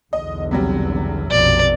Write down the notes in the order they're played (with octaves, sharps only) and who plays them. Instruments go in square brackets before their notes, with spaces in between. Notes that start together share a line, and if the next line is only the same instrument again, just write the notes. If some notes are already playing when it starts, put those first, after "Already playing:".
[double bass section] B1 E2 D3 [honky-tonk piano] D#5
[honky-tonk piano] C3 F#3 G3
[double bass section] A#1 F2 B2 [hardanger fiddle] D5